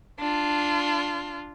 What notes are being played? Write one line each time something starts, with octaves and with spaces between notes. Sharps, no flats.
D4 F4